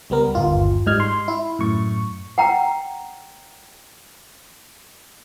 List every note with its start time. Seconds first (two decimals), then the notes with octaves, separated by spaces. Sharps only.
0.10 C#2 G3 B3 A#4
0.35 G1 D#2 F4
0.86 G#2 G3 D#5 F6 G#6
1.00 C6
1.28 E4
1.59 F#2 A2 C#6
2.38 F#5 G5 A#5